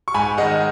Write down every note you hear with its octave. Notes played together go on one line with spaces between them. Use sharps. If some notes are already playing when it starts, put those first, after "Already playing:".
C#6
G#2 G#5 B5
D#3 G#3 D#5 F#5